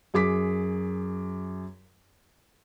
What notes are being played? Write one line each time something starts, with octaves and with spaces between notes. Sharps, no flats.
F#2 G#4 D6 B6